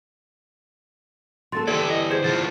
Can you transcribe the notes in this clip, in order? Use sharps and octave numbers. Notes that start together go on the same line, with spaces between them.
F#3 A#3 A4 C6 A6
D3 E3 G4 A4 D5 G#6
D#5
G#4 C5 G#6
D3 F#3 F4 A6